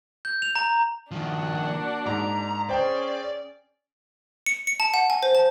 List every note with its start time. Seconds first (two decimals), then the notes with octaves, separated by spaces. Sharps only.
0.25 G6
0.42 F7
0.56 A#5
1.12 D#3 F3 A#3 D4 F#4 F#5
2.07 G#2 A#5
2.69 C#4 G#4 C5 D5 G5
4.46 C#7
4.67 C#7
4.80 A5
4.94 F#5
5.10 G#5
5.23 C5
5.35 A5